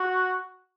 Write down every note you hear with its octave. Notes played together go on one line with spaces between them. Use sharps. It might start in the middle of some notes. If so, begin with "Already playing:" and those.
Already playing: F#4